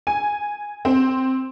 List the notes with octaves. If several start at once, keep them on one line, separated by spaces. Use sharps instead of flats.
G#5
C4